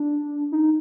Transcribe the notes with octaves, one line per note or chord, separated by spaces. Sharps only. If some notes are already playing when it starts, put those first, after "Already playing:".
Already playing: D4
D#4